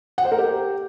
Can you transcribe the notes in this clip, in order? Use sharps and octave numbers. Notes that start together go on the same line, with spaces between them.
F#5
C5
A#4
G4